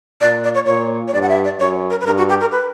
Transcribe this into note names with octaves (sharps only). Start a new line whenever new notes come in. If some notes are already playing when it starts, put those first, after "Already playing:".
A#2 D5
D5
C#5
A#2 C#5
C#5
G2 D5
F#5
E5
D5
F#2 C#5
A#4
B4
G2 A#4
F#4
G4
A#4
B4